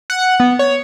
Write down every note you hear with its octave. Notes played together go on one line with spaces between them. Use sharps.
F#5
B3
C#5